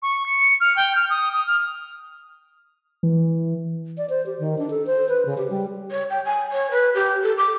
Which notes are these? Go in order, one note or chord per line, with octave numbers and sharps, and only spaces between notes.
C#6
C#7
F6
G5
F6
D#6
D#6
F6
E3
D5
C5
G4
D#3
D4
A4
C5
B4
C#3
G4
G3
C#5
G5
G#5
C#5
B4
G4
A4
D6